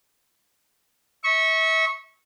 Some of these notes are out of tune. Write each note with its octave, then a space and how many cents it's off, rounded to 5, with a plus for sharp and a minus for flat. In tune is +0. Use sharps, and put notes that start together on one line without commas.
E5 -35 C#6 -10